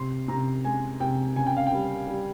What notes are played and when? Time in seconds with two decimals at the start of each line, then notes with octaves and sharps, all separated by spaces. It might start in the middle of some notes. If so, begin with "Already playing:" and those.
Already playing: C3 C6
0.28 C3 A#5
0.65 G#3 G#5
1.00 C3 G5
1.36 C#3 G#5
1.47 G5
1.57 F5
1.67 G5
1.72 G3
2.08 G3